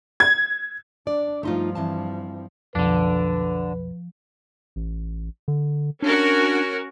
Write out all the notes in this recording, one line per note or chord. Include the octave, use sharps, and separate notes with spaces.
G#6
D4 D5
G2 F3 A3 D#4 F4
E3 C4 A5
B1 F2 D3 F3 D4 B4
A1
D3
C#4 D4 F#4 A#4